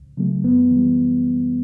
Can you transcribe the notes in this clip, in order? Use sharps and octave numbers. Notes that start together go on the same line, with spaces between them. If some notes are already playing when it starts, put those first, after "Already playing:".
Already playing: C#2
C#3 F#3 A3
F#2 B3
E3
G3